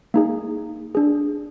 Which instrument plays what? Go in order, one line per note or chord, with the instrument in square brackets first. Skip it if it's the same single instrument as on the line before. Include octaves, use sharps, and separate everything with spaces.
[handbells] A#3 D#4 G#4
D4 G#4